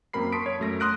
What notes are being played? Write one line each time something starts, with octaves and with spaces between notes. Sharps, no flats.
F#2 A#3 C4 A#4 B5 C7
A5 C6 C#6 D#6 B6 D7
C#5
F#2 A3 A#6
C6 D#6 F6 F#6 A#6 D7